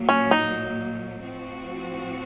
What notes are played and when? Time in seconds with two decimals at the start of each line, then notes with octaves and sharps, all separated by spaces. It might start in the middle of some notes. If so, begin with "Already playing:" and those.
Already playing: A#2 F#3 A#3
0.09 C#4
0.31 D#4
1.22 A2 F3 C4 F#4